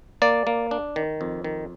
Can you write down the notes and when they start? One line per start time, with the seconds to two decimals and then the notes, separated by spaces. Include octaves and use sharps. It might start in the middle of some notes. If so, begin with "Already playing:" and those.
0.22 A#3 D5
0.47 A#3
0.71 D4
0.96 D#3
1.21 F2
1.44 D#3